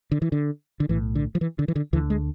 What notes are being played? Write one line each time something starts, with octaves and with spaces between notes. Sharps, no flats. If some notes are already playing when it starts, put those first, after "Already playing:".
D3
E3
D3
D3
B1 A2 E3
D3
F3
E3
D3
E3
D3
D2 D3 E3
G#3